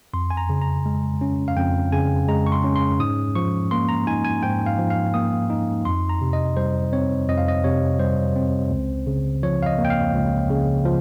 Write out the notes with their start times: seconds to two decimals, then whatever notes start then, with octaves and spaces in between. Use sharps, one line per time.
0.13 F2 C6
0.30 G#5
0.37 A#5
0.49 C#3
0.61 A#5
0.86 G#3
1.21 C#4
1.48 F5
1.57 F2 G5
1.92 C#3 G#5
2.28 G#3 A#5
2.47 C#6
2.52 C6
2.64 C#4
2.76 C6
3.00 G#2 D#6
3.36 F3 C#6
3.71 A#3 C6
3.89 A#5
4.07 D#4 G#5
4.25 G#5
4.43 G#2 G5
4.66 F5
4.78 F3
4.90 F5
5.14 A#3 D#6
5.50 D#4
5.85 F2 C6
6.09 A#5
6.21 C3
6.33 D#5
6.57 G3 C5
6.93 C4 C#5
7.28 F2 D#5
7.38 F5
7.48 D#5
7.64 C3 C#5
7.99 G3 C5
8.36 C4
8.71 C#2
9.07 C#3
9.43 F3 C#5
9.62 F5
9.66 D#5
9.78 A#3
9.85 G5
9.90 F5
10.14 C#2
10.50 C#3
10.85 F3